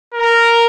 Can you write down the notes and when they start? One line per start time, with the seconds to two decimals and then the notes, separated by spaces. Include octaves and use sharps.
0.14 A#4